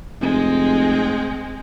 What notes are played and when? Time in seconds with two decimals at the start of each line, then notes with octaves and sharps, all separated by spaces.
0.21 F1 G#3 C4